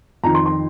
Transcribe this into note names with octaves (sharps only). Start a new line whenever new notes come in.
F2 D#3 A#5
C6
C6